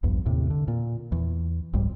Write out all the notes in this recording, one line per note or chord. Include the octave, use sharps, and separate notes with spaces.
A#1 E2 G2
D#2 A2 C3
D3
A#2
E2
F1 C2 G#2 G3